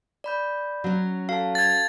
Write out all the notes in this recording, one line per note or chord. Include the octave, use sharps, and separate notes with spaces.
D5 B5 G6
F#3 C#4
F#4 A4 F5 A5
G#6 A6